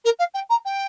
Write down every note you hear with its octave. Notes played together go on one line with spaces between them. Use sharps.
A#4
F5
G5
A#5
G5